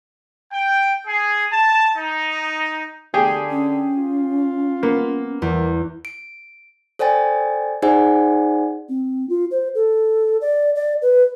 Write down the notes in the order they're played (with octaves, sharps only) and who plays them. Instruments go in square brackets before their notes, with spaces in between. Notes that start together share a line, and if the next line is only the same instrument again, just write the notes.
[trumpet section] G5
G#4
A5
D#4
[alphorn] D3 [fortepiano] G4 G#4 [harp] G5
[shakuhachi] C#4
[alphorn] F4
[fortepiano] A#3 [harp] B3
[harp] E2 [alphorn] A#4
[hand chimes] D7
A4 C5 D5 G5 G#5 A6
D#4 G#4 C5 D5 F#5 G#5
[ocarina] C4
F4
C5
A4
D5
D5
B4